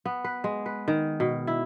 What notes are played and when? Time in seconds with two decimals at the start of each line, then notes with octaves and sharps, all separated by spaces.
0.05 B3
0.24 B4
0.44 G#3
0.66 B4
0.88 D#3
1.20 B2
1.47 E4